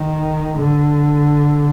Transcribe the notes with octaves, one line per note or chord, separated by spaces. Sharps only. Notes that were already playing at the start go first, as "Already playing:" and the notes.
Already playing: D#3
D3